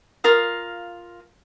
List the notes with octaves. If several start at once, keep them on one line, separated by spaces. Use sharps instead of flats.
F4 A#4 F5 D#6